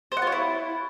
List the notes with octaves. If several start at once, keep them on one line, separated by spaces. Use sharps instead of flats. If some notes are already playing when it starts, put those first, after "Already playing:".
C5
F#5
F4
C#5
E4